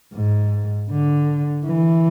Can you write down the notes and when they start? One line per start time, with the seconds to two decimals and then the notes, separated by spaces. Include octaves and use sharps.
0.14 G#2
0.90 D3
1.67 E3